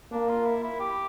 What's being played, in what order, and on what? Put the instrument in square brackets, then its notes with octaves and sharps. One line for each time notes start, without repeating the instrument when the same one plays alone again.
[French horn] A#3 [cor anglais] D4
[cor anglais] F4
E4
E4
G4